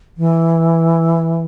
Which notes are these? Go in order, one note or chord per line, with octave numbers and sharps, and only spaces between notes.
E3